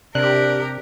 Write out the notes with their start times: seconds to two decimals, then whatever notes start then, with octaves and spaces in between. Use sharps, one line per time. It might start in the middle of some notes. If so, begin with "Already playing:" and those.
0.15 C3 D4 G4 A#4 F#6